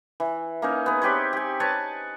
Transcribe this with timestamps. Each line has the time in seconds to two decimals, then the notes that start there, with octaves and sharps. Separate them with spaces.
0.20 E3
0.62 A#3 C#4 D#4
0.86 B3 G#4
1.02 C4 G4 B4 C#5
1.33 G4 G#5
1.60 B4 C#5 G#5 A5